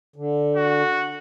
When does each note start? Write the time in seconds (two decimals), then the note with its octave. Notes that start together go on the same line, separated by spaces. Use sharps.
0.16 D3
0.56 F#4